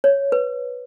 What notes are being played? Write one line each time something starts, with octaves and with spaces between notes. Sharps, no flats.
C#5
B4